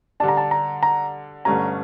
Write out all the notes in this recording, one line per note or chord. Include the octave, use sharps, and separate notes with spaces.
D3 G3 D4 A5
A#5
A5
A#5
A#5
G1 G2 D3 A3 C#4 A#5